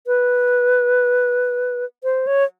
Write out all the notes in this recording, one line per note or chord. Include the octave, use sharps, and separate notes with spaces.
B4
C5
C#5